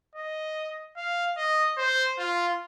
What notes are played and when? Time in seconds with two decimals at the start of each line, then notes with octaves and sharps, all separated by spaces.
0.15 D#5
0.97 F5
1.37 D#5
1.78 C5
2.18 F4